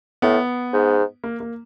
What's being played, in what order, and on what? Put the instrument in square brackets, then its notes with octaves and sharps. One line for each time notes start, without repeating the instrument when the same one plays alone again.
[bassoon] A2 [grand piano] B3
[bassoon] G#2
[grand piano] A#3
A#3